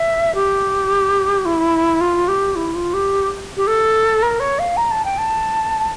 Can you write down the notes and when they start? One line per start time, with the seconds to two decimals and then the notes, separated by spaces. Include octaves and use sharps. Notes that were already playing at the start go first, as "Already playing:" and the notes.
Already playing: E5
0.35 G4
1.45 E4
2.01 F4
2.28 G4
2.56 E4
2.75 F4
2.94 G4
3.57 G4
3.67 A4
4.22 A#4
4.40 C#5
4.59 F5
4.77 A#5
4.91 A5
5.05 G5
5.18 A5